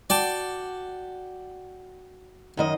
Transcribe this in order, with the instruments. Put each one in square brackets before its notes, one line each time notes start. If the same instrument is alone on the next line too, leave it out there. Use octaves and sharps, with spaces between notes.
[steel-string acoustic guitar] F#4 [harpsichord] D5 G5 A5
[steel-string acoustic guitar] F#2 D#3 D#5